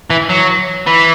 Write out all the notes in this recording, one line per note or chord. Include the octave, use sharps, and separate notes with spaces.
E3
F#3
E3